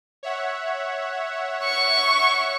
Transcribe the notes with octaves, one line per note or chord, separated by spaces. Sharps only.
C#5 E5 F#5
C#6